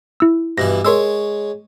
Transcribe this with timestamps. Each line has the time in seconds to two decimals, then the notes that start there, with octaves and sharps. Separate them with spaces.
0.20 E4 E6
0.58 G2 B2 E3 A#6
0.85 G#3 A#4 C#5 C6 E6